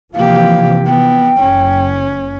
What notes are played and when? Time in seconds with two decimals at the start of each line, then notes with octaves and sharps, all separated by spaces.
0.15 C3 E3 F3 A#3 G4 F5
0.86 B3 G5
1.39 F#1 C#4